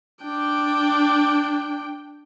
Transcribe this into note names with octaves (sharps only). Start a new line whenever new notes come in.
D4 G5